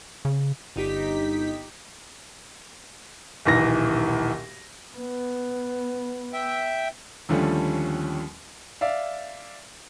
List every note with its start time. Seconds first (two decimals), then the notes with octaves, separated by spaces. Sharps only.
0.25 C#3
0.76 G1 D#4 G4 B6
3.46 D#1 B1 E3 A#6
4.96 B3
6.33 E5 G5
7.29 D#2 D3 F3 G3 A3 C#4
8.81 D5 E5 F5